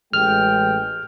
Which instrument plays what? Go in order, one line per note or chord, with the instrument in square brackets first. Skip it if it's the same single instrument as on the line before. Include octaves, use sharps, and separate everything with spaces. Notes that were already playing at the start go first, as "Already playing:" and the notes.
[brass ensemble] A1 G#3 G5 [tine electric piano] F6